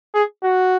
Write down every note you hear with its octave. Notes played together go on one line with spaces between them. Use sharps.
G#4
F#4